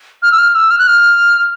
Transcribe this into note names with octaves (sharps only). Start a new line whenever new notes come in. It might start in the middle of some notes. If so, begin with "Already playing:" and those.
F6
E6
F6
E6
F6
F#6
F6